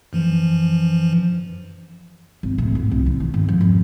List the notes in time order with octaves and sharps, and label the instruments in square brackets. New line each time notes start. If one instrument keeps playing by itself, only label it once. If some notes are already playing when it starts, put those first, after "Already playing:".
[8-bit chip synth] F#2 E3 F3
[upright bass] G#1
A2
F4
C2
D#3
D#3
G#2
F3
F2